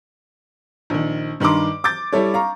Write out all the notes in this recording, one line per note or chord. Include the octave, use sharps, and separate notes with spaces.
A#1 D#3
G2 D#3 A#5 C6 D6
D6 G6 A6
G3 E4 A4 C#5
F5 A#5 C#6